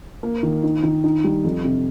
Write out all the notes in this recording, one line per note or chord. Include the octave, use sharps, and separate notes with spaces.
A#3
D#3
D#4
D#3
D#4
G3
F2
C3